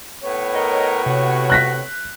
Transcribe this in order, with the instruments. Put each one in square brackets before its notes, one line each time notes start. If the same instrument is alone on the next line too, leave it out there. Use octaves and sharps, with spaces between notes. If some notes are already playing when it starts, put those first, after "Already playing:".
[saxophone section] A2 B3 C#5
[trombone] A#4 [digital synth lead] D#5
[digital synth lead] C3 [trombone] F#4
[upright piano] F#6 A#6 B6